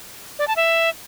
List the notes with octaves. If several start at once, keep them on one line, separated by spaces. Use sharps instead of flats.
D5
A5
E5